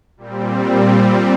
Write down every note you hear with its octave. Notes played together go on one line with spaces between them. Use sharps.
A#2 G3 C4